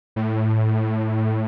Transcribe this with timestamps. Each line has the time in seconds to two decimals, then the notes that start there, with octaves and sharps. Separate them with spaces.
0.16 A2